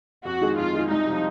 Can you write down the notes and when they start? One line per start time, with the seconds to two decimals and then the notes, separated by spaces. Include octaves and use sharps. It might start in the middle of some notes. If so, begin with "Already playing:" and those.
0.25 F2 F#4
0.41 D#3 G#3 D#4 G#4
0.57 F2 F4
0.73 D#3 G#3 D#4 G#4
0.89 C2 D#4
1.06 C3 F3